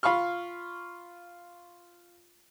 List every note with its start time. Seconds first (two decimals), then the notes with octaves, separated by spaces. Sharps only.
0.03 F4 F5 B5 C#6 F6